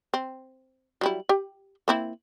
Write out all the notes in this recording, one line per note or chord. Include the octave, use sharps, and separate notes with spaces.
C4
F#3 G3 E4
G4 G5
A#3 C4 E4